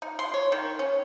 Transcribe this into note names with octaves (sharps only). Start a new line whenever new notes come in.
D#4
C6
C#5
D#3
C#4